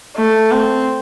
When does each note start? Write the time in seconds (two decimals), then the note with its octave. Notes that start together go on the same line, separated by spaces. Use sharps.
0.16 A3
0.52 C4